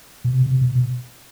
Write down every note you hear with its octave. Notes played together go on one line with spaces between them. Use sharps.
B2
C3
C3
B2
B2